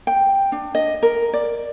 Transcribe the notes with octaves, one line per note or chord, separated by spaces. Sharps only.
G5
D4
D#5
A#4
D5